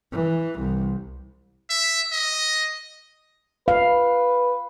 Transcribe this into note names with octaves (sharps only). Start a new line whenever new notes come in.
E3
C2
E5
D#5
B4 F5